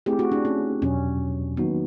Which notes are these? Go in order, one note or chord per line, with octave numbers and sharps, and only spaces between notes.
A3 C4 E4 G4 G#4
F#4
D4
C#4
E2 B2 F#3 C#4
D#3 F#3 A#3 B3 D#4 F#4